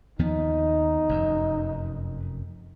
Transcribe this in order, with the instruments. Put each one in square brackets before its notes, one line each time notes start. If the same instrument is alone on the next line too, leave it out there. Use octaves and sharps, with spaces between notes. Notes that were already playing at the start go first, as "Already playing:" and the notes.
[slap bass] D#2 F3 B3 [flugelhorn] D#4
[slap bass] F1 F#2